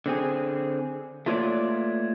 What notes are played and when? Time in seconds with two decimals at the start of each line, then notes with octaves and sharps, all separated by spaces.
0.06 D3 C4 G#4
1.26 A3 A#3 F4 B4 C#5 D5